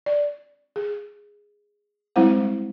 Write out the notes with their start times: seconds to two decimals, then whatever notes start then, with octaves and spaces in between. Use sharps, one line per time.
0.06 D5
0.76 G#4
2.16 G3 G#3 C4 E4 C5 F#5